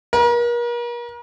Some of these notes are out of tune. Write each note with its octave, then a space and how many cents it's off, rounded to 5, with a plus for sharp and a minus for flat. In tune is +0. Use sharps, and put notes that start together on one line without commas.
A#4 +40